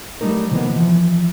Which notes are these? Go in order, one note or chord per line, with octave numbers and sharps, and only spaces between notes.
F#3 G3 A3 D4 D#4 A#4
C3 D#3 E3 F#3 A#3 B3
E3 F3